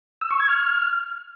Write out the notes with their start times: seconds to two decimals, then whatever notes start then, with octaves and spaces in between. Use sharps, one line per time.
0.21 E6
0.30 C#6
0.40 G#6
0.49 F6